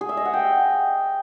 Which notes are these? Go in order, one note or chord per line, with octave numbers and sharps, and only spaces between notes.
G#4
E5
D#5
F#5
G5